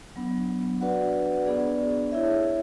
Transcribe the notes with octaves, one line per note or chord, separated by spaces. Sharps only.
F#3 B3 D4
D4 F#4 B4 D5 F#5
B3 D4 G#4 D5
E4 G#4 C#5 E5